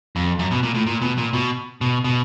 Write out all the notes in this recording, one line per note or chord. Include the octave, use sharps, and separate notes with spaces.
F2
F#2
B2
A#2
A2
A#2
B2
A#2
B2
B2
B2